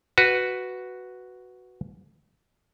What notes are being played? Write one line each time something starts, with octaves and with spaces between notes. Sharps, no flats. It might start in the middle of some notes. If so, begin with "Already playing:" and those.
F#4 B4